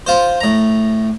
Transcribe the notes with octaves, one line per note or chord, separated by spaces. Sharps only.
F4 C5
A2 A#5